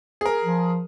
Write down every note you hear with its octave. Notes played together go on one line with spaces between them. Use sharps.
G#4 A#4
F3